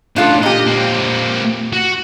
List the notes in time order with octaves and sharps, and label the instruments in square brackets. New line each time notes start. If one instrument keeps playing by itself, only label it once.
[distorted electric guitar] A2 C#3 [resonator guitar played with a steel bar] D4 F4 A4
[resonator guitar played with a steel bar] A#2 G4 [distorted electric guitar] D#5
[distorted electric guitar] A#3 C4
F#4